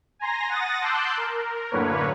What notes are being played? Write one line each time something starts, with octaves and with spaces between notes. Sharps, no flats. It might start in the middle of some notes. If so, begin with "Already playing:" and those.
G#5 A#5 C6 A#6
F#5 D#6 A6 A#6
A5 C6 D6 E6 F#6 G6
A#4
F#2 A2 D3 A#3 B4 C#5